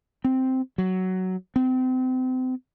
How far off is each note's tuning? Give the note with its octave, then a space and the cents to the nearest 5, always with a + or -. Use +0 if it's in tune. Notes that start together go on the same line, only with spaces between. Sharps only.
C4 -5
F#3 +10
C4 -30